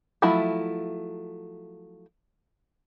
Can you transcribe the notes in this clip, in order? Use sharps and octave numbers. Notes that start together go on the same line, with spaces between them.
F3 F#3 A3 E4 B5